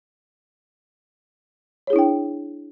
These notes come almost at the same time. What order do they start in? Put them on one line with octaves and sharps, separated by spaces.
C#5 G#4 E4 D4 G5